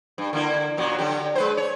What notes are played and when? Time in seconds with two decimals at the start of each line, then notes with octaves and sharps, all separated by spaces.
0.18 G2
0.33 D3 A#3 E4
0.77 F#2 A#2 F#3
0.98 D3 F#3 G4
1.35 G#3 B4 C5
1.57 C#5